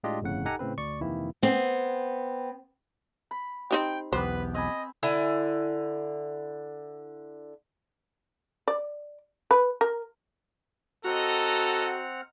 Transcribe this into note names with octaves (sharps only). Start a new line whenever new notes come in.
A2 G#3 D4 F4 G4 D#5
G1 F2 A2 C#3 F#5
D#4 G4 A4 F#5 G#5 A#5
A2 C#3 C4 B4
D2 D5 C#6
F2 C3 D#3 E3 A#3 E4
B3 C4
B5
C4 D#4 G4 G5
B1 E2 B3 G4 B4 C5
C4 D#5 G#5 B5
D3 E4 G#5
D5
B4
A#4
C4 F#4 A4 D#5 F#5 A#5 F6